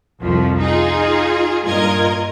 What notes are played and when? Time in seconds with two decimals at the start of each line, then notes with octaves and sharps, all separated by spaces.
0.20 C2 F2 F3
0.59 D#4 F4 G#4
1.64 G2 A#2 F4 A#4 D#5 G#6